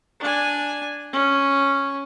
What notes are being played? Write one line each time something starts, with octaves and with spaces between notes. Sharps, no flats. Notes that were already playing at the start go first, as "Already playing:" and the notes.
D4 G#5
C#4